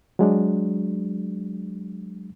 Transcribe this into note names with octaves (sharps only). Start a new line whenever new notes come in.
F#3 G#3 D4